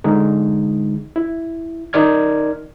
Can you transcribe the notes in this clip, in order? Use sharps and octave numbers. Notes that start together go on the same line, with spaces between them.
D3 G#3 D#4
E4
D#4 A#4 D5 F6 G#6